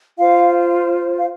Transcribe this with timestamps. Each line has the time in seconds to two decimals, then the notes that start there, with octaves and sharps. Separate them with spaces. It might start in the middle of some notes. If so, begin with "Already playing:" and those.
0.19 F4 C5 F5
1.18 F5